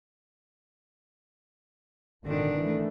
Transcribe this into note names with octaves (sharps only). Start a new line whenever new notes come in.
G#1 A#2 D3 D#3 D4
E3 A3